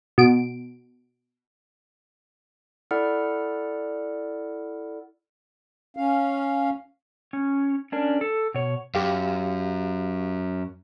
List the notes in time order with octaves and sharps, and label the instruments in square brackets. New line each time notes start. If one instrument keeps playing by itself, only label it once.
[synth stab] B2 D7
[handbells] E4 A4 D5 F#5 F6
[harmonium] C#4 F5
[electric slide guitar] C#4
C#4 D4 A#4
A4
B2 C#5
[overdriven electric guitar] F#2 [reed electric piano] G4 F5